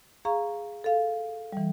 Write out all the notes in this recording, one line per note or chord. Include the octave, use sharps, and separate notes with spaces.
G#4 F5 A#5 C#6
A4 F5
E3 G3